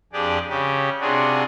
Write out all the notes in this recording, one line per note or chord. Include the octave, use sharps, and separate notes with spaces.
F2 D4 G4 G#4 D5
C#3 G4
C3 D4 F4 F#4 G#4